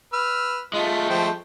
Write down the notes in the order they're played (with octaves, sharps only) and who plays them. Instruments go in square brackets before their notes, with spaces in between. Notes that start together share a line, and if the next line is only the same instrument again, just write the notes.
[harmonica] B4 E6 F6
[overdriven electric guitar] G#3 A3 [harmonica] F4
[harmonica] F3 C5 G5